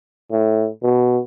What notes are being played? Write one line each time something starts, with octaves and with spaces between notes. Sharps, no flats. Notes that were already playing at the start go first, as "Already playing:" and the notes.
A2
B2